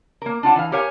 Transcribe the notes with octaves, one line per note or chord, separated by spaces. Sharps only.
A#3 A#4
D4 F4 F#5 A5
E3 F5
G4 A#4 C#5 F5 G#5 A#5